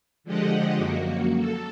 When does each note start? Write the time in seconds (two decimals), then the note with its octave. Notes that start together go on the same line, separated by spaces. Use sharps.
0.24 D3 F3 G#3 G4 D#5 F#5
0.77 F#2 A#3 F#4
1.38 A4